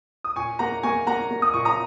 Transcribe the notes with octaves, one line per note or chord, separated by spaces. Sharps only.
D#6
A#2 G#5 C#6
A#3 F#5 A#5
A#3 G#5 C#6
A#3 F#5 A#5
A#3
D#6
A#2 C#6
A#5 D#6